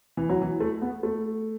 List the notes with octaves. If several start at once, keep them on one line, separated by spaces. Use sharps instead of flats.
E3
F#3
E3
A3
B3
A3